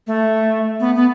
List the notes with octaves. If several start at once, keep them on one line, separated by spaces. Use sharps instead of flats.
A3
B3
B3